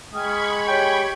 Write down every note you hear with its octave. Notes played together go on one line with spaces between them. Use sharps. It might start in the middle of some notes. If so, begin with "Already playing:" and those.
G#3 G5 B5 C#6 D#6 F6 G#6
G4 C#5 G5